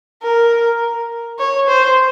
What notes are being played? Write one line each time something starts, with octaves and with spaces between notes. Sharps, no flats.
A#4
C#5
C5